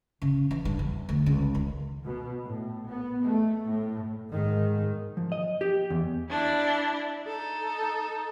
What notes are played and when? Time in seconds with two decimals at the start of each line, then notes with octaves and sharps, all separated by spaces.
0.22 C#3
0.51 E3
0.65 G2
0.79 E2
1.09 D2
1.26 C#2
1.55 D#3
2.04 B2
2.44 A2
2.87 B3
3.24 A3
3.68 A2
4.30 G#2 D#3
5.17 F3
5.32 D#5
5.61 G4
5.90 E2
6.30 D4 E4
7.26 D#4 A4